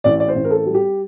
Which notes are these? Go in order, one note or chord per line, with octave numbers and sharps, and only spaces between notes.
A1 D5
D5
C5
A1
A#4
A4
G3
G4